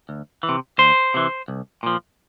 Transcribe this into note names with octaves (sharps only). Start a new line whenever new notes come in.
D2
E3
C3
D2 C5
C3 E3
C2
A#2 F3